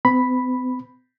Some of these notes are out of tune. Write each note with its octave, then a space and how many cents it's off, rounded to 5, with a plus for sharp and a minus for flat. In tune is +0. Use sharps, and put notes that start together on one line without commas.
C4 -45 B5 +0